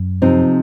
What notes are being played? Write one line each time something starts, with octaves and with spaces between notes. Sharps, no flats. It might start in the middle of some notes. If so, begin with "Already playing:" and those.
Already playing: F#2
C3 F3 C4 D#4